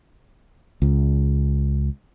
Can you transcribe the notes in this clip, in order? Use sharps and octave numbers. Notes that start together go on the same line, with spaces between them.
C#2